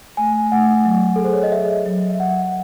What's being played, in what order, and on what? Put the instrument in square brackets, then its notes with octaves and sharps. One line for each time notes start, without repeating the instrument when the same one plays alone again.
[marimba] A3 [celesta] G#5
[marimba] A3 [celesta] F#5
[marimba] F#3
[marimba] G#4 [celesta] A4
[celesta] C5
C#5
D#5
[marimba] G#4 [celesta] E5
[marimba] F#3
[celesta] E5
[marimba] F#3 [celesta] F#5